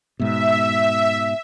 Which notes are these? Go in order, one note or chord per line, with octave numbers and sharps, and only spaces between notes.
G#2 B2 E5